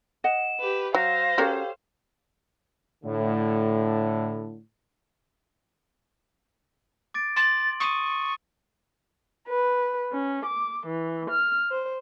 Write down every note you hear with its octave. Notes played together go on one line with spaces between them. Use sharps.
D#5 F#5 E7
G4 B4
F#3 C5 F5 A#6
C#4 F#4 G4 A4 A#4 C#5
A2 D3
D6 A6 D7
C6 A6 F#7
C#6 D#6 D#7
B4
C#4
D6
E3
F6
C5